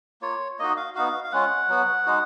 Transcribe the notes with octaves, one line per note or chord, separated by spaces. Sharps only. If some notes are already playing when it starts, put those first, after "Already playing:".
A#3 F4 C#5
A#3 D#4 F#4 D#5
F5
B3 D#4 F#4 F5
F5
G#3 C#4 F4 F#5
F#3 B3 F#4
G#3 D#4 F#4